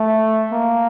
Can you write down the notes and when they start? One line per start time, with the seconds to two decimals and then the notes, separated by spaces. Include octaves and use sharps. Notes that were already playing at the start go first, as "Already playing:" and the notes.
Already playing: A3
0.52 A#3